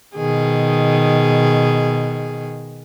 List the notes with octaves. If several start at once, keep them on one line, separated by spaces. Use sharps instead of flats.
B2 D#3 G#4